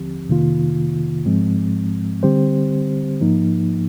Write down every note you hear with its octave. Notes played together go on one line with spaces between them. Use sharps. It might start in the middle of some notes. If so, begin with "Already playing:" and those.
Already playing: D#2 D3 F3 C4 G4
F2 C3 D#3 A#3 F4
G#2 F3 G#3 C4
D3 G3 C4 G4 C5
G#2 F3 A#3 D#4